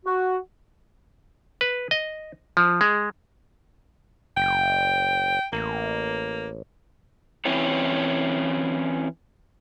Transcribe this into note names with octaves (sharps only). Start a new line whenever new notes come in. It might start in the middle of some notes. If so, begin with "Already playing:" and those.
F#4
B4
D#5
F3
G#3
F#1 G5
A1 A#3
E3 C4 C#4 E4 C#5